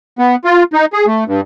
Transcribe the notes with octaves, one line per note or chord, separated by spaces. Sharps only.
B3
F4
D#4
G#4
A3
G2